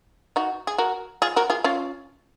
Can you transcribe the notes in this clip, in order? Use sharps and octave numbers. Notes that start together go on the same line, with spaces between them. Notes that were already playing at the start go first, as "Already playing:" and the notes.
D#4 F#4
G#4
F#4 A#4
F4 G#4
F#4 A#4
F4 G#4
C#4 F4